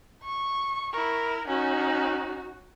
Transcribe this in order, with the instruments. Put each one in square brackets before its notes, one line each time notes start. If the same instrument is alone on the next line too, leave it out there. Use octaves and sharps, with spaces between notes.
[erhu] C#6
[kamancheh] E4 A#4
[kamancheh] C#4 D#4 [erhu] F#4